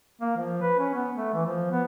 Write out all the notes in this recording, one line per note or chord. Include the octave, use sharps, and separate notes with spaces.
A#3
F3
B4
C#4
B3
A3
E3
F3
B3